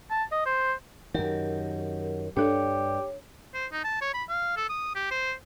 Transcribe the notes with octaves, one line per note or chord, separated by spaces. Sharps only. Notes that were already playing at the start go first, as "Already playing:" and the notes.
A5
D#5
C5
F#2 D#3 F#3 G4 A#4
G2 D4 G4 A4 C#5
C5
D#4
A5
C#5
B5
F5
A4
D#6
G4
C5